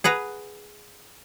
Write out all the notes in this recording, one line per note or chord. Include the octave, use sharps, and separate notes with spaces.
G#4 B4 F#5 A#5